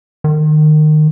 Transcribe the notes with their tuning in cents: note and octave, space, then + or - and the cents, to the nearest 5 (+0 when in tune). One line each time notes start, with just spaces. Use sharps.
D#3 -25